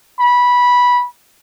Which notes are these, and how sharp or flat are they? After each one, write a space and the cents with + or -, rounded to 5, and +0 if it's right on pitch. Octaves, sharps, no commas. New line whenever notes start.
B5 -10